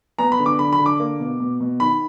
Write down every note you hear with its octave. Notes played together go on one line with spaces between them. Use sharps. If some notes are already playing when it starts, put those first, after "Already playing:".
B3 A#5
B5
D3
D6
D3 B5
B5
D3
D6
A#3
B2
B2
B2
D#3 B5